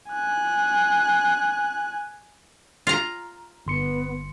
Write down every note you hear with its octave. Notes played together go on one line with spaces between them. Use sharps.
G#5 F#6
F4 A#5
G1 B3 C6 C#7